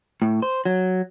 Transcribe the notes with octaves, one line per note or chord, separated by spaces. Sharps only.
A2
C5
F#3